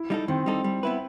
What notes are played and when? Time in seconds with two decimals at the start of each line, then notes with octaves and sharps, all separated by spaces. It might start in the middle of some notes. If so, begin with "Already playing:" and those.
Already playing: E4
0.10 G3 D#4 A4
0.28 D#3 C4
0.46 G3 D#4 A4
0.64 G3
0.83 B3 E4 B4